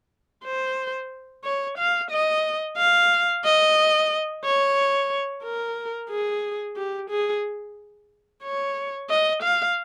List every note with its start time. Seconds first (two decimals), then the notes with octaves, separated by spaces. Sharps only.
0.45 C5
1.44 C#5
1.78 F5
2.11 D#5
2.77 F5
3.44 D#5
4.44 C#5
5.44 A#4
6.10 G#4
6.76 G4
7.10 G#4
8.44 C#5
9.09 D#5
9.43 F5